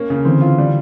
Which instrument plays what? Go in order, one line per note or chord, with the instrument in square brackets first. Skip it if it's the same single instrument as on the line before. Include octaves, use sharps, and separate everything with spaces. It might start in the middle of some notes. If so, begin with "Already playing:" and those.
Already playing: [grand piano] A#3 C#4
C#3
[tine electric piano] D3 E3 [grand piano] C4
[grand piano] F4
G3